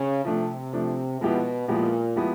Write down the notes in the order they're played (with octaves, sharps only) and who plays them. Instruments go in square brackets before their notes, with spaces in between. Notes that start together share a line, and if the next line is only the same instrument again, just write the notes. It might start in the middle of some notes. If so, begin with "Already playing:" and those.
Already playing: [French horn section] C#3
[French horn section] C3 [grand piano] F3 A3 D4
[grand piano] F3 A3 D4
[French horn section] B2 [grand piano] F3 G#3 B3 E4 G4
[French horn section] A#2 [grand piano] F3 G#3 B3 E4 G4
[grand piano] F3 G#3 B3 E4 G4